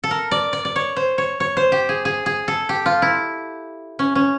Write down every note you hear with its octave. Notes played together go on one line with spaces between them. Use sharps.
A4
A#4
D5
D5
D5
C#5
C5
C#5
C#5
C5
G4
G#4
G#4
G#4
A4
G4
F4
E4
C#4
C#4